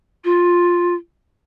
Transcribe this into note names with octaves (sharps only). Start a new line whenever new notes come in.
F4